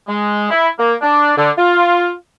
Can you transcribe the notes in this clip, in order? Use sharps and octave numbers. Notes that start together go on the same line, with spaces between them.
G#3
E4
A#3
D4
D3
F4